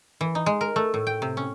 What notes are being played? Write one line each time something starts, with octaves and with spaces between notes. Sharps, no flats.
E3
D#4
G#3
A#4
A3
A2
G5
C3
C#4